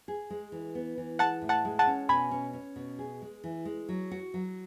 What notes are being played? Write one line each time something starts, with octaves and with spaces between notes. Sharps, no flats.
G#4
G#3
E3
B3
E3
G#3 F#5 A5
A2
F#5 A5
G#3
F#5 A5
C#4
B2 G#5 B5
C#4
C#4
B2
G#4
G#3
E3
G#3
F#3
F#4
F#3